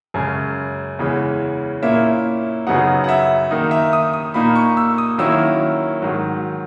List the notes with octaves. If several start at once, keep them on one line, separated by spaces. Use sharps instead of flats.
F#2 C#3 G#3
E2 C#3 E3 G#3 C#4
A#2 A#3 C#4 E4 E5
F#2 C#3 F#3 B3 D#4 F#5
F#5
E5
D#3 A#3 D#4
E5
D#6
D#6
A#2 A#3 D#4 B5
C#6
E6
D#6
D#3 F#3 A#3 C#4 E4 E6
G#2 D#3 F#3